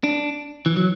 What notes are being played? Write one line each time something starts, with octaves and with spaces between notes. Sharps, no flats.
D4
E3
F#3